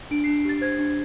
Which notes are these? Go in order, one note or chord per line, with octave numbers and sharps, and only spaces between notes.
D4 D7
C7
D4
G4 A6
C5 G#6
D4